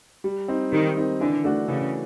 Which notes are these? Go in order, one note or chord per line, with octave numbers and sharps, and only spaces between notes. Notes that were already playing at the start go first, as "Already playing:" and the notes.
G3
C4 D#4
D#3 G3
C4 D#4
D3 E3
A3 D4 F#4
C#3 E3